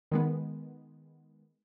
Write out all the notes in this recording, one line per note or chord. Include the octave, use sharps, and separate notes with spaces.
D#3 G#3 B3